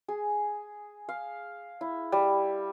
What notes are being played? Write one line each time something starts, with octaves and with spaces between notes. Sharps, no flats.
G#4
F5
E4
G3